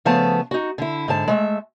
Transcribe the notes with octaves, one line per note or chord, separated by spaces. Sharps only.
C#3 F3 A3 B3 A5
D#4 F#4
D3 E4
G#2 D3 A5
G#3 A3 E5